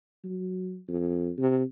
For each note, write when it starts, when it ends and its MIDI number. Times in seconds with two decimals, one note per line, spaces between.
0.24 0.79 54
0.88 1.31 41
1.38 1.64 48